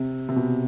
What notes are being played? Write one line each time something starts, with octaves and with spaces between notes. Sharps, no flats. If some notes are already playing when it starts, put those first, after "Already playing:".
Already playing: C3
C3
B2